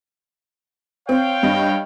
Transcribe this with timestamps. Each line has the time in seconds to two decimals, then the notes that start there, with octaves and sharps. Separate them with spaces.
1.09 C4 C#5 F5 G5
1.43 G2 D#5